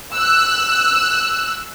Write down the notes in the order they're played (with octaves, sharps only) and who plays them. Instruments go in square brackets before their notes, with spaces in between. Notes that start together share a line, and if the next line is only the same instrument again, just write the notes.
[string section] E6 F#6